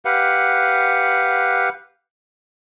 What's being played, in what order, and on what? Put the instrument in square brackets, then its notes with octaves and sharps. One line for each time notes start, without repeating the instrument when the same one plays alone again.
[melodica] G4 B4 F5 F#5